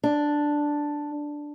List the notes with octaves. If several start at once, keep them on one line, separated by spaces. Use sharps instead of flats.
D4